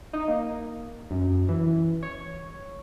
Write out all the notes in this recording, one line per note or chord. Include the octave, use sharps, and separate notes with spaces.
D#4
A#3
F#2
E3
C#5